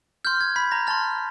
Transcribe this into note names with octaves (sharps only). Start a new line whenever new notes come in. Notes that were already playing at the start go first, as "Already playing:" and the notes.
C6 F6 G6
G#6
B5 B6
A#5 A#6
A5 C6 F6 A6